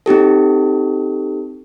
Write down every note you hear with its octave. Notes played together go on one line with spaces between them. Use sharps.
C4 D#4 G4 A4